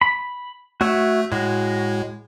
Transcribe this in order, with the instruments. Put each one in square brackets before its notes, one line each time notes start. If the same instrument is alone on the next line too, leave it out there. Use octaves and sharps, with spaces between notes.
[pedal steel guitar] B5
[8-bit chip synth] A3 [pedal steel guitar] F#4 C#5 E5
[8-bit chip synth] A2 [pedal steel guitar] G#3 F#4